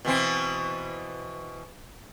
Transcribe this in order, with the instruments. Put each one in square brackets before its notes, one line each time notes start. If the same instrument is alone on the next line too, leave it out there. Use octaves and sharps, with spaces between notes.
[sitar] B2 E3 C4